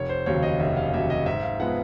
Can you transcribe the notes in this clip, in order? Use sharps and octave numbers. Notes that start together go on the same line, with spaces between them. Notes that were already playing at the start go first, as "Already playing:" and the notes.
Already playing: F1 C#5
C5
D#2 C#3 F#3 C#5
D#5
F1 E5
F5
D#2 C#3 F#3 E5
D#5
G#2 E5
F5
F3 G#3 B3 F#5